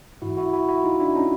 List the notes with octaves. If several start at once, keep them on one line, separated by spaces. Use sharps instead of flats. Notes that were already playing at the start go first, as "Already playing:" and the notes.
G#2 E3 E4 F#4
E4 F#4
E4 F#4
E4 F#4
D#4 F4
D4 E4
C#4 D#4